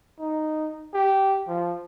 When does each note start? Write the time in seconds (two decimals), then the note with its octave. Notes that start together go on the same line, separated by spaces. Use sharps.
0.19 D#4
0.94 G4
1.48 F3